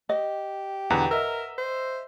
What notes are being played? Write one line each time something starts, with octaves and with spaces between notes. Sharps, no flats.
G4 D#5
E2 B2 D3 B4 F#5 A#5
A#4 D#5 E5 E6
C5